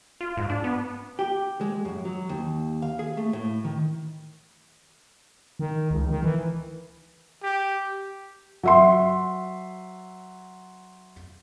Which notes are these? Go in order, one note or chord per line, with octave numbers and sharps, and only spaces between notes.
F4
G#2
D4
B3
G4
G#3
F#2
F#3
D#2
F5
G#4
A3
A2
D#3
D#3
C#2
D#3
E3
G4
F#3 E5 C6